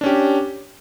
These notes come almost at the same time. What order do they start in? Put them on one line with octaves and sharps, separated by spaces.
D4 C#4 G4